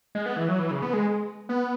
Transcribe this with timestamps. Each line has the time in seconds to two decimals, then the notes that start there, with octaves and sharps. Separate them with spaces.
0.15 G#3
0.26 B3
0.37 E3
0.49 F#3
0.59 E3
0.71 C#3
0.82 B3
0.93 G#3
1.49 B3